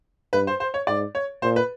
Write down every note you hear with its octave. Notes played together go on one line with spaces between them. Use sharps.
G2 B4
C5
C5
C#5
G#2 D5
C#5
A#2 C5
B4